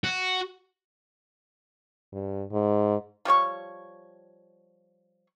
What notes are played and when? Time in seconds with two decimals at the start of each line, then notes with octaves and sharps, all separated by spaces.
0.04 F#4
2.13 G2
2.52 G#2
3.25 F3 G3 C#5 C#6